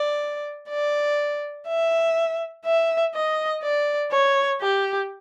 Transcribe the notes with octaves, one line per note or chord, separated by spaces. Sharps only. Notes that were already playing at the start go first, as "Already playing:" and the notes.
Already playing: D5
D5
E5
E5
D#5
D5
C#5
G4